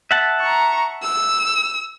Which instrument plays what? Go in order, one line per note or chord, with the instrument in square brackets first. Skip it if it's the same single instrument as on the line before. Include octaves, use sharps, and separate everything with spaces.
[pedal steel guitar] E5 F#5 A5
[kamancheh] A#5 C#6
E6